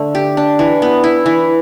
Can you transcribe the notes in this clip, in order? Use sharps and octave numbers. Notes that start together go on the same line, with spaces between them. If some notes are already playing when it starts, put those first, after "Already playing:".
Already playing: D3 A3
G4
D4
E3
B3
E4
E3